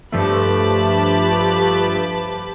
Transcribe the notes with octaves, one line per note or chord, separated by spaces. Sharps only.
G2 F3 A3 G4 B4 A5